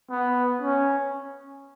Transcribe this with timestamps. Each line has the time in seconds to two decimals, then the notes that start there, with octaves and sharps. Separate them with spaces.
0.10 B3
0.62 C#4